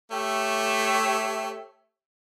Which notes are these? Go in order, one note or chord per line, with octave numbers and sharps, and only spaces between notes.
A3 G4 C#5 E5